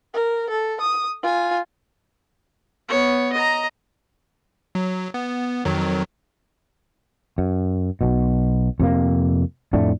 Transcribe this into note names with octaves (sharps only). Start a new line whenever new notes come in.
A#4
A4
D#6
F4 G#5
B3 C#5
D#5 A#5
F#3
B3
F2 D#3 F#3
F#2
B1 B2
F2 C3 A#3
F2 A2 A3 D4